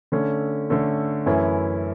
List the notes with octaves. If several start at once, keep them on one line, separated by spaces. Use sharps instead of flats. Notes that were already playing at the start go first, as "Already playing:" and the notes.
D3 A3 C#4
D3 A3 C#4
F#2 E3 A3 C#4 E4